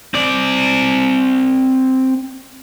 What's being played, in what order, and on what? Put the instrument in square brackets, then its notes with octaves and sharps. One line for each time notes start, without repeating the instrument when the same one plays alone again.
[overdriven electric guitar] C4 D5